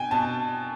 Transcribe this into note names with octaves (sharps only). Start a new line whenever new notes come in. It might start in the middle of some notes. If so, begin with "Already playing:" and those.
Already playing: B2 G5 G#5
B2 A5